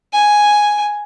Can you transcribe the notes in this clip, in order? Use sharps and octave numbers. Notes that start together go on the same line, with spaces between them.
G#5